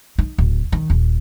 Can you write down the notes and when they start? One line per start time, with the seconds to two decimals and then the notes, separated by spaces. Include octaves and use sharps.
0.18 D#4
0.38 D1
0.72 D#3
0.90 D#1